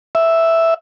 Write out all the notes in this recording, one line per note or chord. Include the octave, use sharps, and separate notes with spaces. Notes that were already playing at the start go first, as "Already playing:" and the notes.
E5